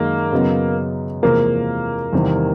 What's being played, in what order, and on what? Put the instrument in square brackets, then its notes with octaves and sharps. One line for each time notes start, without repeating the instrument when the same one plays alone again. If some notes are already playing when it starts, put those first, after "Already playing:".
Already playing: [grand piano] F#2 D#3 G#3 [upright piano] A#3
[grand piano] F#2 C#3 F#3 B3 D#4
[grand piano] E2 C3 F3 G#3 [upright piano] A#3
[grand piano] E2 C3 D#3 G3